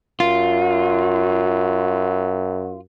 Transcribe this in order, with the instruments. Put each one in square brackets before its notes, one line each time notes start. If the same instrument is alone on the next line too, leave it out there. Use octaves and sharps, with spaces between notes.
[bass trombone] F#2 [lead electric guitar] F4